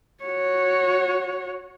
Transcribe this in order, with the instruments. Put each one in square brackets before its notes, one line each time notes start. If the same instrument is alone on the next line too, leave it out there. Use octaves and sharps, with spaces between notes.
[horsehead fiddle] F#4 C#5